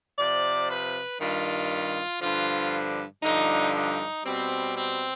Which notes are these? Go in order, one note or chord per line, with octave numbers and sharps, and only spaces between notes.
C3 F3 D5
B4
G2 D#3 G3 F4
G2 D3 F3 F4
G2 D3 F3 D#4
D#4
B2 G3 C4
C4